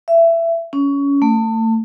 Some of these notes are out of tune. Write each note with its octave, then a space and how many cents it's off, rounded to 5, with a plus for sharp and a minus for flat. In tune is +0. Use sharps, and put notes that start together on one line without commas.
E5 +20
C#4 +20
A3 +30